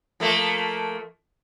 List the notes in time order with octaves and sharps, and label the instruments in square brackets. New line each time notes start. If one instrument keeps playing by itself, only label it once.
[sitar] F3 A3 A#3